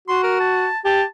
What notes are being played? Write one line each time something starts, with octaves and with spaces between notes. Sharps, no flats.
F#4 C6
A#4
A5
G4 A5